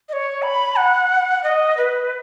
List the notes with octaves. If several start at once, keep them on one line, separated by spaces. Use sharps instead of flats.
D#5
C#5
B5
F#5
D#5
B4